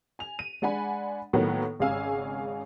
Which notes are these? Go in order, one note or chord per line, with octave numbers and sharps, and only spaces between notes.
G#5 F7
D#7
G#3 D4 F#5 G#5 B5
A2 D#3 F#3 A#3 B3
G#1 C#3 G#4 F5 G#5 E6